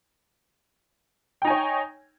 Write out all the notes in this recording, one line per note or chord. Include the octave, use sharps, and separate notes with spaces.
D#4 C#5 G5 G#5